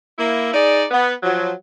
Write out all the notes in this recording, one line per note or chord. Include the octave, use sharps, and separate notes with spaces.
A#3 E4
D#4 G#4 D5
B3
F3 F#3